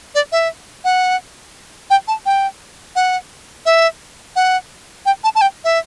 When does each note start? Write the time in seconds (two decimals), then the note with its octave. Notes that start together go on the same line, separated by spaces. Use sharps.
0.15 D5
0.32 E5
0.84 F#5
1.90 G5
2.08 A5
2.26 G5
2.96 F#5
3.66 E5
4.36 F#5
5.06 G5
5.24 A5
5.35 A5
5.41 G5
5.64 E5